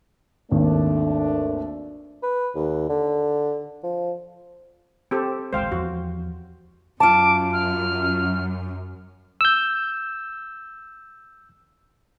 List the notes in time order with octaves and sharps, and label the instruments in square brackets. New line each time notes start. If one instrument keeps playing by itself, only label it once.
[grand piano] G#1 D#2 [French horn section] A3 D4
[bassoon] B4
D#2
D3
F3
[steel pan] C4 G4 A4
[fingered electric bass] D1 G#1 G#3 [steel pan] C5 F5 G5
[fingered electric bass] E2 F3 [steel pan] F#4
[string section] F#2 [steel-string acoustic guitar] F4 A5 [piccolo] D6
[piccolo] F6
[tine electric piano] E6 G6